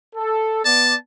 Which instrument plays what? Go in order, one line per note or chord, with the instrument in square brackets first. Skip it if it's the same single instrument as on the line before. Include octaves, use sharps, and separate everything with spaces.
[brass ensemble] A4
[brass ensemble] B3 D5 [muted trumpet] A5